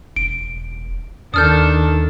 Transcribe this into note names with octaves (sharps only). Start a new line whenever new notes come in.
E1 D7
D#2 D#3 D4 A4 D#6 F6 G6